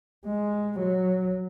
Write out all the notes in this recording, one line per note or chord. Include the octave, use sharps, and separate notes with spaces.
G#3
F#3